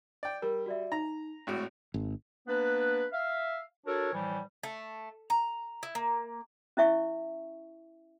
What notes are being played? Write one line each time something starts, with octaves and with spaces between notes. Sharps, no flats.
D5 G5
G3 A#4
F#4 D5 E5
D#4 A#5
G#1 A2 F#4 F#6 D7
G#1
A#3 B3 D4 B4
E5 F5
D4 F#4 A4 A#4 C#5
A2 E3 F3 G3
A3
A#5
E4
A#3
C#4 E4 E5 C#6